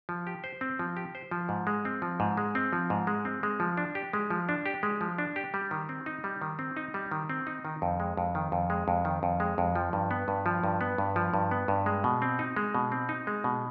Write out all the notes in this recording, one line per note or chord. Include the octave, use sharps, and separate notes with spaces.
F3
G4
C5
C4
F3
G4
C5
F3
G#2
G#3
C4
F3
G#2
G#3
C4
F3
G#2
G#3
C4
G#3
F3
D4
G4
G#3
F3
D4
G4
G#3
F3
D4
G4
G3
D#3
C4
D#4
G3
D#3
C4
D#4
G3
D#3
C4
D#4
D#3
F2
G#3
F2
D#3
F2
G#3
F2
D#3
F2
G#3
F2
F3
G2
B3
G2
F3
G2
B3
G2
F3
G2
B3
G2
G#3
B2
C4
D#4
G#3
B2
C4
D#4
G#3
B2